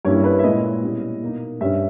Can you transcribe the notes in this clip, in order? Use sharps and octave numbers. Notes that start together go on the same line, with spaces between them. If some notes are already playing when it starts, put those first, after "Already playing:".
G2 G3 A#3 C#4 E4 C#5
B4
E5
A#2 G#3 C#4 E4 D#5
B2 G3 C#4 E4
B2 A#3 D#4
G2 G3 C#4 E5